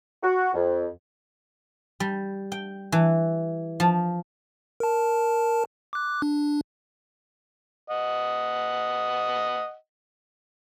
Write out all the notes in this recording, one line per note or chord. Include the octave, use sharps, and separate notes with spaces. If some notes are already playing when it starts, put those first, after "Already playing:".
F#4
F2
G3
G5
E3
F3
A#4 A5
D6 F#6
D4
D#5 F#5